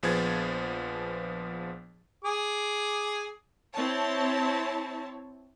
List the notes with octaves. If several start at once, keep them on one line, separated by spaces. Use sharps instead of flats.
A#1 F3 B3 G#4 G#6 A6
G#4 D6
C4 E4 C#5 A5